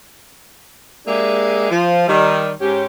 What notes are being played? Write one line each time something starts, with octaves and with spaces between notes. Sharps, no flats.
G#3 A#3 D4 G4 G#4 E5
F3
D#3 G3
G#2 C#4 G4